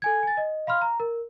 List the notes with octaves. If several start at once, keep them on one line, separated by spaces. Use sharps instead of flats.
A4 G#5 G#6
G#5 A6
D#5
F5 B5 C6 F6
A#5
A#4